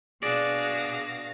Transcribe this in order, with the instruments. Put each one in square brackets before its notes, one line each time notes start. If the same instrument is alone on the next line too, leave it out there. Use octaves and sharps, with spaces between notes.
[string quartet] B2 F5 A#6 [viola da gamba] D4 F#4 [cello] G#4 [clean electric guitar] D5